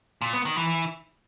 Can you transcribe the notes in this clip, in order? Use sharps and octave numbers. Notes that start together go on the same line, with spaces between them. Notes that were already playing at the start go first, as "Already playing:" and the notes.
A#2
B3
D#3
E3